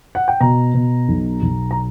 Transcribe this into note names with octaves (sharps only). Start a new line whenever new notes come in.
F#5
G5
B2 A#5
B2
B1
B1
A#5